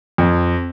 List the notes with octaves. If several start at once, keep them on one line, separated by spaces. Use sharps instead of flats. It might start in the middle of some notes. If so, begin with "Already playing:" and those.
F2